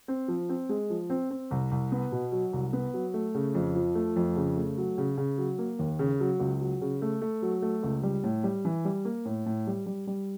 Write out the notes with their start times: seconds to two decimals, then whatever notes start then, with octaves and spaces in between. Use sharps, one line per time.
0.08 C4
0.28 F3
0.49 C4
0.69 G#3
0.90 F3
1.10 C4
1.30 C4
1.51 C2
1.71 C2
1.92 B3
2.12 B2
2.32 F#3
2.53 C2
2.73 B3
2.94 F#3
3.14 A3
3.35 C#3
3.54 F2
3.75 F3
3.95 A3
4.16 F2
4.36 C#3
4.57 A3
4.77 F#3
4.98 C#3
5.17 C#3
5.38 F#3
5.58 A#3
5.79 D#2
5.99 C#3
6.20 F#3
6.40 C#2
6.61 F#3
6.81 C#3
7.02 A3
7.21 A3
7.42 F#3
7.62 A3
7.83 C#2
8.03 G3
8.24 A2
8.44 G3
8.65 E3
8.85 G3
9.05 A#3
9.25 A2
9.46 A2
9.67 G3
9.86 G3
10.07 G3